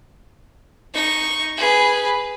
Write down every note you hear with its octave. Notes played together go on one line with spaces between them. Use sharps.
D#4 C#6
G#4 B4